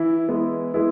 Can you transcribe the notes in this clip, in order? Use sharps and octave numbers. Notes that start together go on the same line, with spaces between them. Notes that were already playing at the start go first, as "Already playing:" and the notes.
Already playing: E3 E4
E3 G#3 B3 E4
E3 G#3 B3 E4